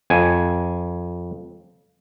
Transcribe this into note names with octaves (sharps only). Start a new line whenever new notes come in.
F2 G#5